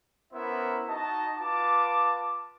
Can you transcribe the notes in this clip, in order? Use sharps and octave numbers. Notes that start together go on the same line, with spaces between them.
B3 C#4 E4 A#4 C5 E5
D#4 F#4 D#5 A5
F4 B4 A5 D6